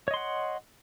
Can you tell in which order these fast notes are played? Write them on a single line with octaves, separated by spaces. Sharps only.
C#5 D#5 C6 F#5